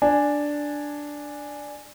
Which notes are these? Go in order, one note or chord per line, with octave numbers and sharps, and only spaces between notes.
D4 G#5